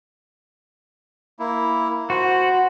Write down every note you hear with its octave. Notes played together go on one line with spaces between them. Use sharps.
A#3 E4
F#4 C5